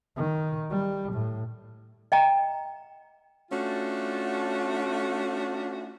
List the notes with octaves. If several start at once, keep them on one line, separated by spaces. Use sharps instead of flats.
D#3
G3
A2
D#5 G5 A#5
A3 C#4 D4 F4 F#4